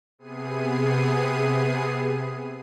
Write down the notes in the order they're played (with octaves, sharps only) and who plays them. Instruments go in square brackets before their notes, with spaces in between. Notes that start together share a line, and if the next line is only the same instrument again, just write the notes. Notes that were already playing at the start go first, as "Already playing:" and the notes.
[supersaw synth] C3 B3 G#4 C7 D#7